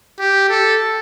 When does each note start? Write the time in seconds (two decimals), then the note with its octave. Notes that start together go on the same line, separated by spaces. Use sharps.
0.19 G4
0.49 A4